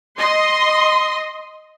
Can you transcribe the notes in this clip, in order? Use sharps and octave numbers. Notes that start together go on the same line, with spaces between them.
D#5 C6